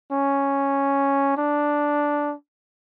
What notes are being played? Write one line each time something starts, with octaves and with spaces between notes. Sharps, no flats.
C#4
D4